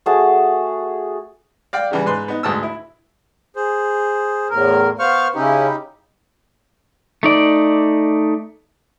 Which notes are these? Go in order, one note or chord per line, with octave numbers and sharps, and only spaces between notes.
A3 F#4 G#4 A5
D5 F5 G5
C#3 E3 G3
G#2 B4 C6
B3 D#4
D2 G#2 A5 D#6 E6
E4
G#4 C5
E2 A2 A#4
B3 C5 F5 C#6 F6
C#3 C#4 D#4 E4 G4
A3 D#4 D5